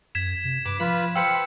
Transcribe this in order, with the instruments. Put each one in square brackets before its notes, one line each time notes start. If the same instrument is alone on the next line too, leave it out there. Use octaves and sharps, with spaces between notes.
[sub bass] F#2 [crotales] G#6 B6 E7
[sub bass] C3
[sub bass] G2 [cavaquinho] B4 [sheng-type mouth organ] D6
[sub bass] F3 [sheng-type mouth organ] F4 B4 [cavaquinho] B5
[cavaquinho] B4 C5 G5 [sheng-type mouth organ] F5 [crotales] E6 C#7